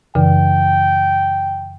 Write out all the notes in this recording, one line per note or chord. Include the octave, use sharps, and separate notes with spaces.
F#2 C#3 E3 G5